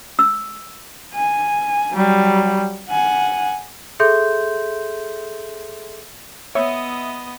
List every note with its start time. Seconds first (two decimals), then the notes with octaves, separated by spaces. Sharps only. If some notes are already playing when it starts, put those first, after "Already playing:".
0.19 E6
1.14 G#5
1.92 F#3 G3
2.89 F#5 G#5
4.00 G#4 A4 E5 C6 G6
6.55 B3 C#5 D#5 E5